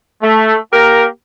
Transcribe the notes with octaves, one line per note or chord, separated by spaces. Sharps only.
A3
A#3 G4 A#4